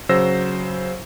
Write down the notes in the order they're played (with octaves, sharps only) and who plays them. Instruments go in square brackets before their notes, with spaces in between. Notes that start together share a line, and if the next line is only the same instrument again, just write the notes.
[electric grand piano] C#3 F#3 C5 E6 A#6